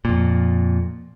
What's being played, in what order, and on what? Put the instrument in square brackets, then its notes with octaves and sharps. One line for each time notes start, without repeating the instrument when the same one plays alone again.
[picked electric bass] F2 A#2